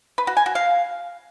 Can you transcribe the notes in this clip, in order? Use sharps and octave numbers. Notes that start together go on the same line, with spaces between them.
B4
F#4
G#5
F#4
F5